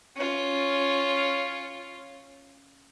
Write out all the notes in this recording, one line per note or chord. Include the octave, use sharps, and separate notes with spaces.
C#4 F4